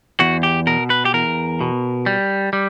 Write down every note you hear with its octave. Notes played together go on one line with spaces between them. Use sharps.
E2 F#4
G4
B2 A#4
B4
G4
E2 A#4
B2
G3
G3